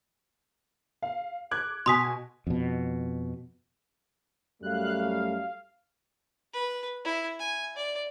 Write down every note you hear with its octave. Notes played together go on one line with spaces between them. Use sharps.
F5
D6 F#6 G#6
B2 G#5 C6 D#6 B6
F2 B2
F#2 G3 A3 F5 F#6
F5
B4
E4
G#5
D5